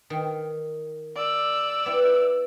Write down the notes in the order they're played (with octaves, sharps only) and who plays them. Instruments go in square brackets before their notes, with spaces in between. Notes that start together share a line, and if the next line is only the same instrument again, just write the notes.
[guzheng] D#3
[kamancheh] D5 E6
[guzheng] B3 E4